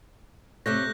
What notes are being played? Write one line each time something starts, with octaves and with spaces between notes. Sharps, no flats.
C3 A3 C#5 F#6 G6 A#6